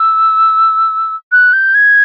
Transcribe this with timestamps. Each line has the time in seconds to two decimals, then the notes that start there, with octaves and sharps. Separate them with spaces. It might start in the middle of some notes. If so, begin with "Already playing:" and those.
Already playing: E6
1.32 F#6
1.53 G6
1.75 G#6